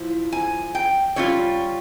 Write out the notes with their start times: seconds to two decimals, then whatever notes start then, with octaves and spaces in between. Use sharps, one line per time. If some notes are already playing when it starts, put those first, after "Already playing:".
Already playing: F3 E4
0.32 G#5
0.75 G5
1.16 G3 C#4 F4 C#5